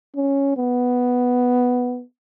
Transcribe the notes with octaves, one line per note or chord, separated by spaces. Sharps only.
C#4
B3